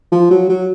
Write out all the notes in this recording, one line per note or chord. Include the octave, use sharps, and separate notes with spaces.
F3
F#3
F#3